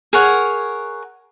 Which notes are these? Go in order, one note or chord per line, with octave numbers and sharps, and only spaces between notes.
G#4 A#4 C#5 F#5